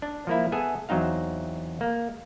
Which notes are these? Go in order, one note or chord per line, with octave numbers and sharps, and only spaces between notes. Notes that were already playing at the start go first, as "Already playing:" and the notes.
D4
F3 A#3 E4
B3 G#4 A4 E5 G#5
E2 F#3 C4 D#4 F5
A#3